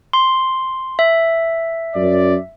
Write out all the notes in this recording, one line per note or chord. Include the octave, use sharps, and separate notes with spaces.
C6
E5
F#2 D5